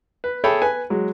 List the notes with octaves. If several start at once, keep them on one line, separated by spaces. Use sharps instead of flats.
B4
G#4 A4 C#5 E5 G5 B5
B4 G#5
F#3 G#3